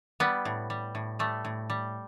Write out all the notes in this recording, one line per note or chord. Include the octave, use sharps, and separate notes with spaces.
G3 B3
A2
G3
A2
G3 A3
A2
G3